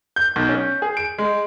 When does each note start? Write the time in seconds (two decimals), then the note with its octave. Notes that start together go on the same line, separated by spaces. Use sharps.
0.16 G6
0.36 B1
0.49 C#4
0.82 G#4
0.97 D7
1.18 G#3